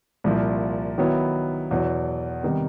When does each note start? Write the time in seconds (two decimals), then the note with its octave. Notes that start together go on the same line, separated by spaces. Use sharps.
0.24 C2 A#2 F3
0.98 D#3 F#3 B3 E4
1.71 E2 B2 F#3
2.43 C3 D#3 G3 B3